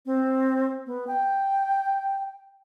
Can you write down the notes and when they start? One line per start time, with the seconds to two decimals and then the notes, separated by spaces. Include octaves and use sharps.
0.06 C4
0.86 B3
1.07 G5